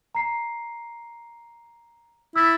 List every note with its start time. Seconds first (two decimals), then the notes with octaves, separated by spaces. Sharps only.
0.15 A#5 C7
2.36 E4 E6 A6 B6